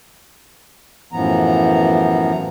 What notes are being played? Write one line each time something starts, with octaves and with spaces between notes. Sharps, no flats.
F#2 A2 E3 F3 B3 A#5